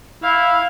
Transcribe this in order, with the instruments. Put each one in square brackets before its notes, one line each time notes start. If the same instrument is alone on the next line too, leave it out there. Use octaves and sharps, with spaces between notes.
[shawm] E4 [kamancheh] F5